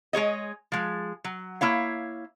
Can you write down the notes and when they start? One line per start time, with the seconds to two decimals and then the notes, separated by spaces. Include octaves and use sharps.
0.13 G#3 G#4 C#5 D#5
0.72 F3 G#3
1.24 F#3
1.61 A#3 E4 C#5 F5